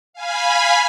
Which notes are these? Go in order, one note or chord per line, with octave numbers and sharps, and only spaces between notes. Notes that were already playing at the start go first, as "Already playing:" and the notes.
F5 G#5 B5